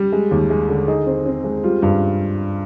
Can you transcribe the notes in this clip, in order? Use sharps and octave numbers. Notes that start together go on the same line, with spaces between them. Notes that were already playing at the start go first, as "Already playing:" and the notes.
Already playing: G3
G#3
D#2
G#3
D3
D#4 G#4
C4
C4
G#3
G3 F4
G2